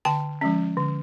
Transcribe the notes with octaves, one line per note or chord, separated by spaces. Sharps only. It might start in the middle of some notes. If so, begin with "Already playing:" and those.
D3 G5 A5
F3 G#3 C#4
D3